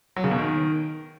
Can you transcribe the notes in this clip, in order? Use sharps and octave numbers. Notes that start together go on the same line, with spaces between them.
F#3
C#3
B2
D#3